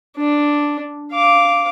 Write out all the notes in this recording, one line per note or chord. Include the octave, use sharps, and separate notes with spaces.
D4
F5 D6